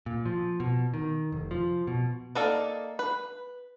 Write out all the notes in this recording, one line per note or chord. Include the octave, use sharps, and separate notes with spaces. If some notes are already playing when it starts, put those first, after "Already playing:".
A#2
F3
B2
D#3
F1
F3
B2
A#3 D#4 A4 A#4 D5
B4